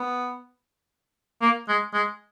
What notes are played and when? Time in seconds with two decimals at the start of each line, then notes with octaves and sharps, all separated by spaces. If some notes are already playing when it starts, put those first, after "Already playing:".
Already playing: B3
1.42 A#3
1.69 G#3
1.94 G#3